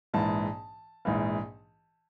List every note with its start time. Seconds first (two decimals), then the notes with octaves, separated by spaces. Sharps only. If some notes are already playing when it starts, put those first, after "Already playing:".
0.14 A#1 G#2 E3 A5
1.05 A#1 G#2 E3